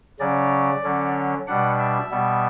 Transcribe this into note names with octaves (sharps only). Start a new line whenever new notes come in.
C#3 F#3 C#4 D5
D3 F#3 C#4
B2 G3 D4 F#5
E5
B2 G3 B3